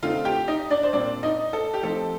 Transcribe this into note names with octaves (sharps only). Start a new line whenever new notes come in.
D3 A3 C4 D#4 F4 F5
G4 G5
D#4 D#5
D4 D5
C5
A#2 G3 C4 D4 D5
D#4 D#5
A4
G4
F3 A3 C4 D#4 A4